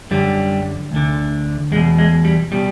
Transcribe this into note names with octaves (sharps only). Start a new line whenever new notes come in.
F#2 D3 G3
D2 D3
E2 B2 G#3
G#3
G3
B2 G3